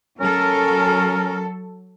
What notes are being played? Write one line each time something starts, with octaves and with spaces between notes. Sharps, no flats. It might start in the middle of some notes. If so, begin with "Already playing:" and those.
F#3 C#4 A4 A#4